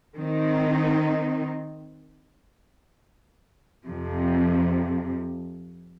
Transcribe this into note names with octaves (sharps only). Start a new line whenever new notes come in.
D#3 C4 D#4
F2 C3 F3